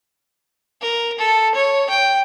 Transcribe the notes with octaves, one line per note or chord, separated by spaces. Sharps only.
A#4
A4
C#5
G5